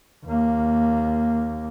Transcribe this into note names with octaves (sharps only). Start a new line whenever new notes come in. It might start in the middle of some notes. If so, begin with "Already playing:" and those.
D#2 A#3